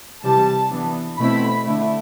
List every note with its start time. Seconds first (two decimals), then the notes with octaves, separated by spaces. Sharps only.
0.23 C3 E3 G3 A5
0.71 E3 B3 D4
1.18 B2 A3 C4 E4 B5
1.66 D3 A3 E4